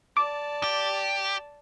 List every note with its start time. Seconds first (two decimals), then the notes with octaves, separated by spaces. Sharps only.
0.17 D5 A5 D6
0.63 G4